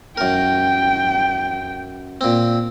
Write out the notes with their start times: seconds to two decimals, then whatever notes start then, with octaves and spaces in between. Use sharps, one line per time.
0.17 F#2 A#4 G5
2.21 A#2 C4